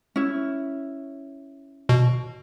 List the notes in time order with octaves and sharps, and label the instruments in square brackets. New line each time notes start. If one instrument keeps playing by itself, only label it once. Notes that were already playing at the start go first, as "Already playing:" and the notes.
[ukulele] C#4 E4
[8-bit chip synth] B2